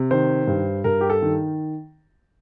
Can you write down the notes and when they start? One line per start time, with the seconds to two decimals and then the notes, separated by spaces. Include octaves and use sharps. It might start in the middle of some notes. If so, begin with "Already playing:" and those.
Already playing: C3
0.11 D#3 C5
0.47 G2
0.84 G2 A#4
1.01 G4
1.10 A4
1.22 D#3